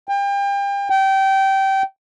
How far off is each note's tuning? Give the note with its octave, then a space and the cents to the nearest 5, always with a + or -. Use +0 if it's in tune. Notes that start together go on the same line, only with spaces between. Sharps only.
G5 +35
G5 -20